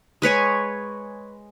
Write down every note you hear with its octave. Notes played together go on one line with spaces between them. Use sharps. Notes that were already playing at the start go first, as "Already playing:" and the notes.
G#3 B4 C#5 G#5